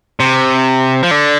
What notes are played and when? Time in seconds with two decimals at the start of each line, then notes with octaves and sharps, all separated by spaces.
0.20 C3
1.03 F3
1.11 D3